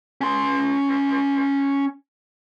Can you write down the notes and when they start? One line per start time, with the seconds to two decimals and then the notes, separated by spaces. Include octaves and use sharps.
0.21 C#4 C6